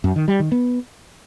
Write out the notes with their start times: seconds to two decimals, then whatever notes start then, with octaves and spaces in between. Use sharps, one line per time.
0.04 F#2
0.16 D#3
0.28 G3
0.40 D#3
0.52 B3